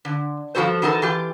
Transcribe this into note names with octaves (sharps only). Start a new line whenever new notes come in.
D3
G2 F3 F#3 F#4 A4 C5
E3 D#4 F#4 A4 A#4
E3 F4 G4